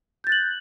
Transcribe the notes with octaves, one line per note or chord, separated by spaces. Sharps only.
F#6 G6 A6 F#7